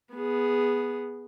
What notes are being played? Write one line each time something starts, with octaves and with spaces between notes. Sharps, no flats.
B3 G#4